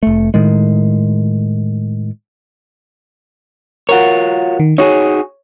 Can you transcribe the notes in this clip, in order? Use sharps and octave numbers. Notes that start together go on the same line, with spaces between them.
F1 A3
A2 D#3 G#3
F4 F#4 A#4 C#5 F#5
D#3
D#4 F#4 G#4 C#5